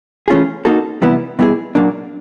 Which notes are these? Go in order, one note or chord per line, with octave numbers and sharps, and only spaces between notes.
E3 A3 C#4 F4 G#4
A#3 D#4 F#4 A4
C3 E3 G3 B3 E4
B2 G3 B3 E4 G#4
A#2 F#3 A#3 D4